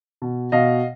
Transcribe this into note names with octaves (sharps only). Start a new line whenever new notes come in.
B2
B2 D#5 F5